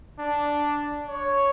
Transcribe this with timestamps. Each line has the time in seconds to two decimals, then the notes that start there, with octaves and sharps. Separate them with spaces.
0.20 D4
1.08 C#5